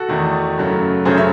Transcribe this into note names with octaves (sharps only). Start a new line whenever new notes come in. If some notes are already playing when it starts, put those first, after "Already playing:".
Already playing: F#4 A4
E2 D#3 A3
F#2 C#3 F#3 A3
F#2 C#3 F#3 A3 G#4 C5
C#5 E5